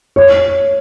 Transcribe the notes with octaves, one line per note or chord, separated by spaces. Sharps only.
C#5